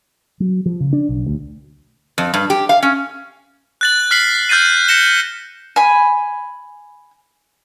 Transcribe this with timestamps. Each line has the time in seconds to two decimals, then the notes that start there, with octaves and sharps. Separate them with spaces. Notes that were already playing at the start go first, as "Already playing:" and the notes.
0.40 F#3
0.66 F3
0.80 C#3
0.93 D4
1.09 B1
1.26 D2
2.18 F2
2.34 G2
2.50 G4
2.69 F5
2.83 C#4
3.81 F#6 A6 F#7
4.11 F6 B6 C7 F#7
4.49 F6 G6 A6 C7 D#7
4.88 A#6 C#7 E7 G7
5.76 G#5 B5